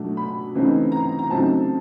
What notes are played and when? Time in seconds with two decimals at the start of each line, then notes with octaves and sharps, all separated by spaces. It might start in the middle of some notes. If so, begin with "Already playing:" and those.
Already playing: B2 F#3 A3 D4
0.17 B5
0.55 C#3 E3 A3 C4 D#4
0.92 A#5
1.19 A#5
1.30 C#3 F#3 A3 C4 D#4 A5